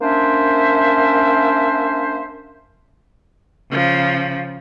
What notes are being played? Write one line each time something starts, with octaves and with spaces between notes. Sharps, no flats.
A#3 C#4 D4 C5 E5
C#3 F3